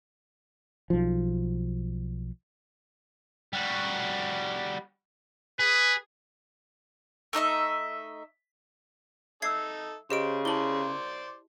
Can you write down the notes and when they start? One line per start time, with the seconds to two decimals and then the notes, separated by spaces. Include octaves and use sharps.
0.90 B1 F3
3.53 G3 F#4
5.59 G#4 B4
7.33 A3 D#4 D#5 E5
9.42 D#4 A4 E5 D6 E6 G#6 C7
10.10 C#3 G4 C5 D#5 D7
10.45 E4 G#4 C5 D5 A5 C6 F#7 G7